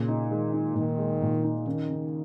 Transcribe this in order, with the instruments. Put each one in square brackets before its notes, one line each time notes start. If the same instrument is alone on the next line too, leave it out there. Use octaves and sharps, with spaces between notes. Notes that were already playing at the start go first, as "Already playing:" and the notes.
Already playing: [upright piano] A#2 [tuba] C#3
[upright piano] D#4
[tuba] D#3 [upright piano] G#3
[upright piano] D#4
[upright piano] A#2 [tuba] D#3
[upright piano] G#3
A#2
D#4
[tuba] D#3 [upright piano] C#4
[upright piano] C#3